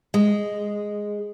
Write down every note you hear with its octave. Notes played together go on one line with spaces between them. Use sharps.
G#3